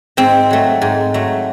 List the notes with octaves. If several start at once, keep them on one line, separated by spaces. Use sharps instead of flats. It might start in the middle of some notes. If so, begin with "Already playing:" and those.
G#2 C4 C5
F#3 A3
G#2
F#3 A3